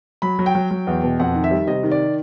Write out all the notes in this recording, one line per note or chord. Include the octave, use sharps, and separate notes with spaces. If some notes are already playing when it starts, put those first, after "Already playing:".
F#3 B5
F#3
G5
F#3
F#3
E2
B2
F2 F#5
D#3
E5
G3
C3 D#5
D#3
D5